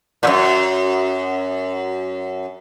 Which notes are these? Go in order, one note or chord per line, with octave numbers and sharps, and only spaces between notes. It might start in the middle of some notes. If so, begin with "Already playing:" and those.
F#2 A#2